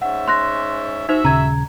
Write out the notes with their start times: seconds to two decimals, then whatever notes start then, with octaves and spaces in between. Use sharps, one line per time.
0.02 G#2 C#4 E5 F#5
0.28 C6 F#6 A#6
1.09 D#4 F#4 C5 E5
1.25 D#1 C#3 A#5 G#6